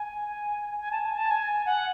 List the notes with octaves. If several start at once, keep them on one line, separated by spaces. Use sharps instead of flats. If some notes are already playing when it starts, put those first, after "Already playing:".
Already playing: G#5
G#5
A5
G#5
A5
G#5
F#5